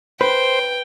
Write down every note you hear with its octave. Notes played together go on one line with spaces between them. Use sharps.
B4 C5 G5